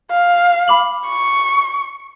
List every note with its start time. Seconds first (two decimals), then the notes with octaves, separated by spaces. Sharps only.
0.11 F5
0.68 B5 D6 F#7
1.06 C#6